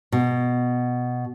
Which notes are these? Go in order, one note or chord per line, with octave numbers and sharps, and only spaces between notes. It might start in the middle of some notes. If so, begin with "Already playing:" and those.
B2